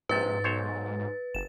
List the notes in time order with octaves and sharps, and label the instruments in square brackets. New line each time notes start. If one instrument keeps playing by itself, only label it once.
[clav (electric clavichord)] A#1 C3 [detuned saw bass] G#2 [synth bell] B4 A6
[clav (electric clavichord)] B1 C5 C#5
[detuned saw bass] F#1 [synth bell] E7